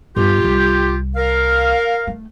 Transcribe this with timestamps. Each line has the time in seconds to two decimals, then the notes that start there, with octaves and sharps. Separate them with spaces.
0.16 G2 B3 F4 G4
0.44 C2
1.16 A#4 F5
2.07 A3